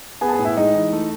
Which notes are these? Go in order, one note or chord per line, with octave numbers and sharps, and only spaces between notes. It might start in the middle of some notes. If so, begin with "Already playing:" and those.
B3 G#4 G#5
A5
G#4 G#5
A2
E4 E5
G#3 D#4 D#5
E3
A3